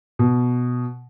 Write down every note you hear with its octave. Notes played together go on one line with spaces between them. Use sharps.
B2